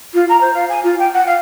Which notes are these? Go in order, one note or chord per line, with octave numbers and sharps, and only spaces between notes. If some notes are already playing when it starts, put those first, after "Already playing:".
F4
A#5
C5
F5
G#5
F4
G5
F#5
F5